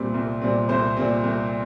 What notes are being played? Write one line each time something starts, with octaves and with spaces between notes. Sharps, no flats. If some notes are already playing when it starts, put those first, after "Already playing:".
Already playing: C2 A#2 G3 C4 D5
C2
A#2 G3 C4
C2 C5
A#2 G3 C4
C2